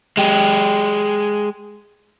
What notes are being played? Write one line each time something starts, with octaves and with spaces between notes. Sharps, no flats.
G#3 G4